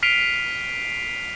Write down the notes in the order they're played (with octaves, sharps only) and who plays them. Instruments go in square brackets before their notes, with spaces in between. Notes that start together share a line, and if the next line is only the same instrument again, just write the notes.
[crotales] F6 B6 C7 D7 D#7 F7